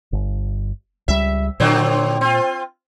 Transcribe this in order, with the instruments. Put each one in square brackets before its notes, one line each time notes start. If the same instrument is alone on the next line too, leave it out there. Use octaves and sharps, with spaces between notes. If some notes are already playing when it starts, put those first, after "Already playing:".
[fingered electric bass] G1
[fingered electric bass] C#2 G3 [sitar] E5
[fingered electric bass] A#2 [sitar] D3 F#3 C4
[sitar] C4 F4